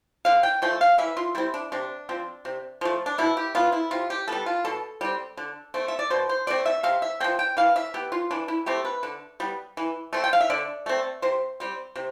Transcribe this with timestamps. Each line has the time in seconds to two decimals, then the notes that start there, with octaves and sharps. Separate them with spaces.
0.25 D3 F5
0.43 G5
0.62 F3 A3 G5
0.81 F5
0.98 E3 E5
1.17 F4
1.35 G3 C4 E4
1.54 D4
1.72 C3 D4
2.09 F3 C4
2.45 C3
2.81 F3 A3
3.06 D4
3.18 B2 E4
3.37 G4
3.55 B3 F4
3.72 E4
3.91 C3 F4
4.10 G4
4.28 G3 B3 A4
4.46 F4
4.65 B2 A4
5.01 G3 C4
5.37 D3
5.74 A3 C4
5.88 E5
5.99 D5
6.10 B2 C5
6.29 C5
6.47 A3 C4 D5
6.66 E5
6.83 C3 F5
7.02 E5
7.20 C4 G5
7.24 F3
7.39 G5
7.57 E3 F5
7.76 E5
7.94 B3 G4
8.12 F4
8.31 E3 D4
8.48 E4
8.66 A3 C4 G4
8.85 B4
9.03 D3
9.40 G3 B3
9.77 E3
10.13 A3 C4
10.24 G5
10.33 F5
10.41 E5
10.50 D3 D5
10.86 A3 C4
11.22 C3 C5
11.60 G3 C4
11.96 C3